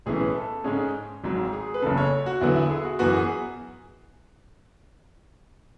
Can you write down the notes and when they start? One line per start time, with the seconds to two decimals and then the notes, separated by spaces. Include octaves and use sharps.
0.06 B1 A2 E3 A3 C#4 G#4
0.20 B4
0.36 A4
0.64 G#2 G#3 C#4 G#4
1.23 G#1 G#2 F#3
1.53 G#4
1.74 B4
1.82 F#1 E2 C#3 A4
1.98 C#5
2.26 F#4
2.41 E2 D3 F#3 B3 E4
2.56 E4
2.71 G#4
2.85 F#4
2.99 F#2 E3 B3 F#4
3.14 G#4